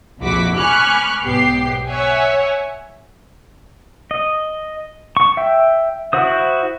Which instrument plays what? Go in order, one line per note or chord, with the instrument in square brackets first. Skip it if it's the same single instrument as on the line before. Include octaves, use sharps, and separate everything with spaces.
[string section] A#1 F2 E4 F#4 D6 B6
G#5 B5 C#6 D6 F6 F#6
B1 G#2 B3 G4 C7
C#5 E5 F#5 G#5
[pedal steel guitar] D#5
C#6
E5 G5
E4 F#4 C5 D#6